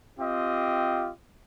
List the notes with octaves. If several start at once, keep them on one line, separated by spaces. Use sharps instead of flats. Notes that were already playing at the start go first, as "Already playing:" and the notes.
C4 F4 G4 D#5